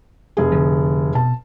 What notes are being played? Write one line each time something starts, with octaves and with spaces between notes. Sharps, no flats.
F1 G#4
D3 F3
B2 A5